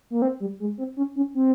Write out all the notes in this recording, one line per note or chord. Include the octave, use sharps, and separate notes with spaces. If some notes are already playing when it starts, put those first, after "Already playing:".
A#3
C4
G3
G#3
C4
C#4
C#4
C4